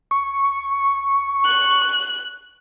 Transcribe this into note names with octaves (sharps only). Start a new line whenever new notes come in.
C#6
F#6